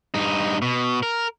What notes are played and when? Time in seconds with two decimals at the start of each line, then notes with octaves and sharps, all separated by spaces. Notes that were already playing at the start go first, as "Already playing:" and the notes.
0.14 G2 D#4
0.62 B2
1.03 A#4